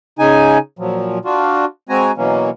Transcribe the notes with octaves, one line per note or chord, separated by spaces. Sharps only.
C#3 D#4 G#5
A#2 F3 F#3
D4 F4 F#4
G#3 C4 F#4 G#5 A#5
B2 E3 F#3 A#3 C#4